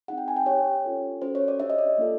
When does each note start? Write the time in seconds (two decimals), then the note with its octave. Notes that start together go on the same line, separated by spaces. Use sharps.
0.08 C4 D#4 G#4 F#5
0.18 G5
0.28 G#5
0.36 G5
0.46 D4 G4 C#5
0.85 C#4 F4 A4
1.22 C#4 F#4 A4 C5
1.35 C#5
1.48 D5
1.60 D4 G4 E5
1.70 D#5
1.79 D5
1.98 A#3 D4 F4 A4